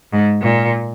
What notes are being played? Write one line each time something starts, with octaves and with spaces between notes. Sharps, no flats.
G#2
A#2